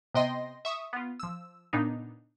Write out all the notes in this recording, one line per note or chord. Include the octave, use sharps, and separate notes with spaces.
C3 B3 D#5 G5 C6 A#6
E5 C#6 D#6
B3 F4
F3 E6
A#2 C#3 B3 D4 D#4